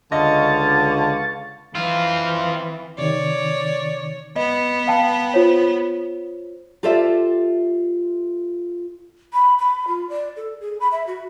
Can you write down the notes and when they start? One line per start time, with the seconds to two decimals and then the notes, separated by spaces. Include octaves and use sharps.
0.12 C#2 D3 D#5 F5 C#6 A6
1.75 E3 C4 C#4 D#4 F4 F5
2.98 C3 D#3 C#5 D5
4.36 B3 D#5
4.87 F5 G5 A5
5.34 F4 C5 C#5
6.83 F4 G4 A4 C5 D5 E5
9.33 B5
9.58 B5
9.88 F4
10.09 D5
10.36 A4
10.60 G#4
10.80 B5
10.92 E5
11.07 F#4